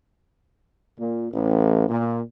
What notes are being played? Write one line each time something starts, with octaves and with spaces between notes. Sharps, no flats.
A#2
A1
A#2